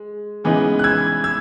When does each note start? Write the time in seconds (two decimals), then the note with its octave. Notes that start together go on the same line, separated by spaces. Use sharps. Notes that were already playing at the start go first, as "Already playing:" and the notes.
Already playing: G#3
0.44 C#3 E3 G#3 B3 D#4
0.79 F#6
0.84 E6 G#6
1.24 E6 G#6